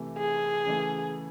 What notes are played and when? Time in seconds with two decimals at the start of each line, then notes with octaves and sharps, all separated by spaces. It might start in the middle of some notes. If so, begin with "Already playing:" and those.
Already playing: C3 E3 A3
0.18 G#4
0.65 C#3 E3 A3